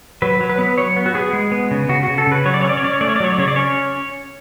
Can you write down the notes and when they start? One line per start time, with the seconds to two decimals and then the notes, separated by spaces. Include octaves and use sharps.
0.22 F#3 B4
0.41 F#3
0.49 B4
0.58 B3
0.78 F#3 C#5
0.96 B3
1.06 F#4
1.14 B3 G#4
1.33 G#3
1.52 B3
1.71 C#3
1.89 C#3 F#4
2.03 C#3 F#4
2.18 A4
2.27 C#3 B4
2.45 F#3 C#5
2.54 D5
2.61 C#5
2.64 C#4 D5
2.77 C#5
2.83 C#4 D5
2.93 C#5
3.01 A3 D5
3.09 C#5
3.16 D5
3.20 F#3 C#5
3.32 D5
3.38 C#3 C#5
3.48 D5
3.56 C#4 C#5